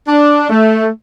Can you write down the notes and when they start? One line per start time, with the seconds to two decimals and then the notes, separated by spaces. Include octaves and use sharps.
0.08 D4
0.50 A3